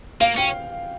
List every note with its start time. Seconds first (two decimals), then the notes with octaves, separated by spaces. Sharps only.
0.21 A#3 F5
0.37 C#4 G5